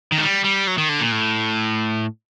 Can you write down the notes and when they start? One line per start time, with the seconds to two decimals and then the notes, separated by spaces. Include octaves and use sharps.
0.12 D#3
0.18 A3
0.23 G3
0.44 G3
0.67 F#3
0.78 D#3
0.89 D3
1.00 A#2
1.12 A2